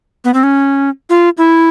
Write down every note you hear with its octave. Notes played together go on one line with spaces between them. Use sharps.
B3
C4
C#4
F4
E4